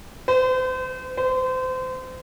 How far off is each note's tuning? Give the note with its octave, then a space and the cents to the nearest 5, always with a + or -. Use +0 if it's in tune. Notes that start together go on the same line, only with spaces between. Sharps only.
C5 -35
C5 -30